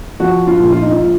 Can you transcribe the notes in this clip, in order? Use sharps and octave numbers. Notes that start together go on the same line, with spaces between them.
F3 F#4
F4
A#1
F4
D#4
F4
A#2